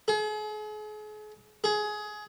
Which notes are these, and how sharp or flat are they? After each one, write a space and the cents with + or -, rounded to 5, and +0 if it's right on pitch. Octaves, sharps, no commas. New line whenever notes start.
G#4 +40
G#4 +20